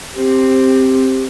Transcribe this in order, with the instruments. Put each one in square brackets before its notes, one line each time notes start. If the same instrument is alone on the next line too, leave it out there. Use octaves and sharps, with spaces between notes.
[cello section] C4 [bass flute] G4